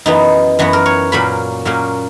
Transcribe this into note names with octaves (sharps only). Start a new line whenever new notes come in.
F#2 E3 B3 D#4
F#2 E3 B3 F#4
A#4
C#5
A#2 F#3 A#3 C#4 B5
A#2 F#3 A#3 C#4